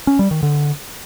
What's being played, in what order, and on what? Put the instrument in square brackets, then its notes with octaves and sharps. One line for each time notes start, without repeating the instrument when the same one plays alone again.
[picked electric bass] C#4
G3
D#3
D3